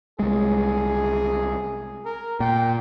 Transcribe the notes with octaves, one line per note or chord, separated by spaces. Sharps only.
C2 G#3 G#4
A#4
A#2 G5